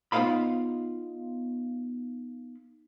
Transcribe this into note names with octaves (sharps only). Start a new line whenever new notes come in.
B3 D#4 F4 C5 F5 B5